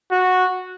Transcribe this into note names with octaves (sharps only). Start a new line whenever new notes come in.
F#4